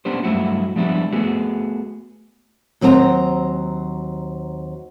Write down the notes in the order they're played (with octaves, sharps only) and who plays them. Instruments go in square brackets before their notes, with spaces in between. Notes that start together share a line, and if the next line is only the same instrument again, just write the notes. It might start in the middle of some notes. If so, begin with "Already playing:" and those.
[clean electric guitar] A#3 B3 C#4 D4 G4 C5
G2 F#3 A3 E4 F#4
F3 G3 G#3 B3 D4 E4
A3 B3 F#4 G#4
[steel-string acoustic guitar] D#2 F#3 C4 D5 A#5